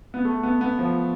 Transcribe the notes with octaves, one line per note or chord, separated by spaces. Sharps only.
B3
A3
B3
B3
F3